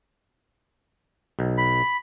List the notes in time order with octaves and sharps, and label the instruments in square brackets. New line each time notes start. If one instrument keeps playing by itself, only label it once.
[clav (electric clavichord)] B1
[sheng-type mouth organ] B5